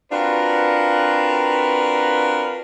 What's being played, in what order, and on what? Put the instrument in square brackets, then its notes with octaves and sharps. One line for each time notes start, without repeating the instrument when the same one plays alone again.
[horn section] C4 D4 F4 F#4 A#4 B4